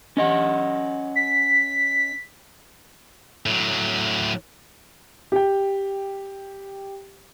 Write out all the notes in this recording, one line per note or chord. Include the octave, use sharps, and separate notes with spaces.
C#4 D#5 F#5
B6
A2 F#3
G4 G5